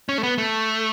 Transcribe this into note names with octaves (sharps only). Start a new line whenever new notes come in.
C#4
A3
B3
A3